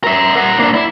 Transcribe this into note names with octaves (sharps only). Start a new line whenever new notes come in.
A#4 E5
A#4 F#5
A#3 D4
E4